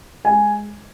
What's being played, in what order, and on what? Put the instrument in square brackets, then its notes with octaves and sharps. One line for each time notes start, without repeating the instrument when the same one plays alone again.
[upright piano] G#3 G#5